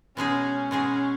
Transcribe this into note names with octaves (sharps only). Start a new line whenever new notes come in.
B2 G#3 C#4 D#4 G#4
B2 G#3 C#4 D#4 G#4